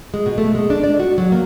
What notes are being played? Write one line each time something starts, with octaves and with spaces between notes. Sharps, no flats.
G#3
B2
A3
G#3
D4
D5
F#4
F#3
A#3